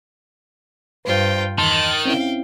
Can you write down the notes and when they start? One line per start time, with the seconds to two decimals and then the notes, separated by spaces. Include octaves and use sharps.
1.05 G2 F4 B4 C5 G5
1.58 E2 D#3 A5 C6 F#6 A6
2.05 C4 C#4 E4 F5 G5